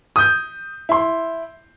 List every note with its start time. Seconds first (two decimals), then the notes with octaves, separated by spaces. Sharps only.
0.16 D#6 G6
0.89 E4 C6